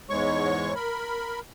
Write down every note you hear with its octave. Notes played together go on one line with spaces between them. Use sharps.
E2 G#2 G#3 C#5 C#6
A#4 B5